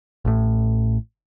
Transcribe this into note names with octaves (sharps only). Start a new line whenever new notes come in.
A1 A2